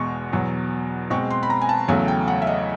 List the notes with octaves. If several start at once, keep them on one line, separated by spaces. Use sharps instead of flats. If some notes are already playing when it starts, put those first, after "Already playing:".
Already playing: E2 B2 G#3 C6 C#6
E2 B2 F#3
B2 G#3 C4 C#6
C6
B5
A#5
G#5
A5
E2 C#3 F#3 A3 G#5
G5
F#5
E5
D#5